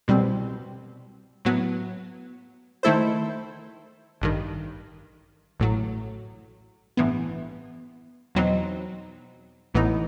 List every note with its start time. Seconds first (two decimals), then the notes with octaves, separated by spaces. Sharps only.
0.08 C2 B2 G3 C4
1.45 A2 F#3 B3
2.83 D#3 A3 E4 A4 C5
4.22 A1 G2 D#3
5.60 A1 A2 F#3
6.97 A1 G2 E3 B3
8.35 E2 B2 F#3 C4 D#4
9.74 A1 A2 E3 B3 D#4